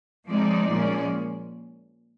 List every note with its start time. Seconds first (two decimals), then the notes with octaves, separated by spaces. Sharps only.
0.27 F3 G#3 C4 D#4 D5
0.69 A#2 F3 G#3 C#4